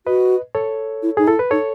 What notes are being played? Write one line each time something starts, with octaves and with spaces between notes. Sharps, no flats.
F#4 B4 D#5
A4 C#5
E4
D#4 G#4
E4 A4
B4
D#4 A4 C#5